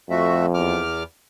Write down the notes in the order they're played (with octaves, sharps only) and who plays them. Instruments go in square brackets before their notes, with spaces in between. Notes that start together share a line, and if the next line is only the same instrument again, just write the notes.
[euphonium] F2 [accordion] A3 F#4 E5
[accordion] E2 D6 F6